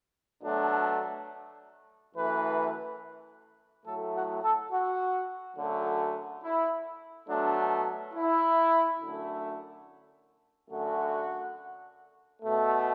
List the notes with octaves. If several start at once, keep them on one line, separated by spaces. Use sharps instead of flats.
B2 F#3 A3 D4
F#2 E3 A3 B4
A2 F#3 A3 A4
F#4
A4
F#4
F#2 D3 F#3 A3
E4
B2 F#3 A3 D4
E4
F#2 D3 A3
F#2 D3 A3 F#4
B2 A3